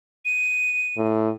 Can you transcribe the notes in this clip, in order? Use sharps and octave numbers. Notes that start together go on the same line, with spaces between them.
D#7
A2